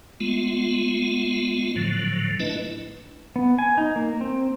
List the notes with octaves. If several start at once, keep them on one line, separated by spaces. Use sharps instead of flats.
G#3 A3 B3 F4
A2 D3 F3 F#3
A3 D4 E4 B4 D#5
B3
G#5
D#4
A#3
C4